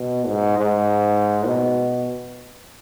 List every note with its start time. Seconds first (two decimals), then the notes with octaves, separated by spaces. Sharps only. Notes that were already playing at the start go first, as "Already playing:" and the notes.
Already playing: B2
0.27 G#2
0.57 G#2
1.46 B2